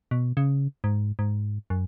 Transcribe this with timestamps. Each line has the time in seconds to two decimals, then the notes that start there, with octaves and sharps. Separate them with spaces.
0.11 B2
0.37 C#3
0.84 G#2
1.19 G#2
1.70 F#2